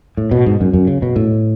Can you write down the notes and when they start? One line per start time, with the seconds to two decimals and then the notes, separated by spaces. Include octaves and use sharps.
0.17 A2
0.31 B2
0.46 G#2
0.61 F#2
0.73 F#2
0.87 C#3
1.02 B2
1.16 A2